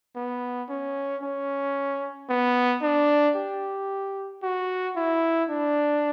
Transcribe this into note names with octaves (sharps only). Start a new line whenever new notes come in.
B3
C#4
C#4
B3
D4
G4
F#4
E4
D4